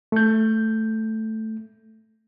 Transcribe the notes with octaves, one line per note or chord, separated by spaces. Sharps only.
A3 G6